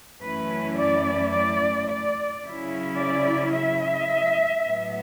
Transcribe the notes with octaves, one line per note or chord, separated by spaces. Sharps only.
F#2 E3 A3 C#4 E4 B4
D5
D5
D5
C#3 F#3 C#4 E4
D5
E5
A2 F#3 B3